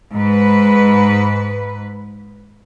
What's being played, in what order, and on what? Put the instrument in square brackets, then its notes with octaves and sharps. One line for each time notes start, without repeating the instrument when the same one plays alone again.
[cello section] G#2 B4